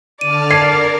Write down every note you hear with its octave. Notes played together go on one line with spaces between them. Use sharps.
D3 D5 A5 F6 D#7
A#4 G#6 C7